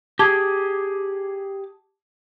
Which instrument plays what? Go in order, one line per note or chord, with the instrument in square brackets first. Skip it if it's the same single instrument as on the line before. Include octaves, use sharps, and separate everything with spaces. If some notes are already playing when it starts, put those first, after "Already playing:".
[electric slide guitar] G4 G#4 [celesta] A5 D6 G#6